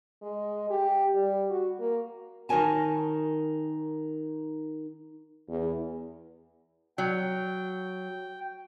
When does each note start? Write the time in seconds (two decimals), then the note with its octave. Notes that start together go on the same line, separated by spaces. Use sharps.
0.22 G#3
0.70 G4
1.15 G3
1.50 F#4
1.80 A#3
2.49 D#3 D#4 A#4 C#5 G#5 A5
5.49 E2
6.98 F#3 G5